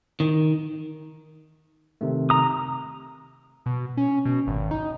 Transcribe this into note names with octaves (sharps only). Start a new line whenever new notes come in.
D#3
C3 D#3 A3
A#5 D#6
B2
C#4
B2
G#1
D#4